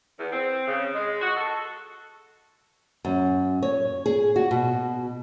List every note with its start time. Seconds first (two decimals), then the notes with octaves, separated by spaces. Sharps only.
0.19 E2
0.33 C4
0.68 C#3
0.95 G#3
1.22 F#4
1.37 A4
3.05 F#2
3.62 C#5
4.06 G#4
4.36 F#4
4.51 B2